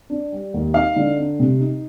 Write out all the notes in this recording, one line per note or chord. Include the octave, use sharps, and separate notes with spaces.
D4
G3
D#2
D#4 F5
D3
D4
C3
D#4